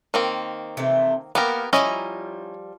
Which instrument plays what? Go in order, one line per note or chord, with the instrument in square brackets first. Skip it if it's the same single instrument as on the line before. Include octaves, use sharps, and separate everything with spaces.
[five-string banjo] D#3 A#3 C4
[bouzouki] C3 E3 A3
[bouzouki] A#3 [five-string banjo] B3 G4 A#4
[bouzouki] F3 G3 A#5 [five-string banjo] C#4 E4 D#5